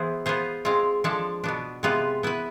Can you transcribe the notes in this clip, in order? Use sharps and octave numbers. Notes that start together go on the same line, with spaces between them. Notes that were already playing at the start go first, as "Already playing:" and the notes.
Already playing: E3 B3 E4 G#4 C5
B3 F4 G#4 C5
G#3 C4 F4
F3 G#3 D4 A4
B2 B3 D4
C3 G#3 B3 F4 B4
B3 E4 B4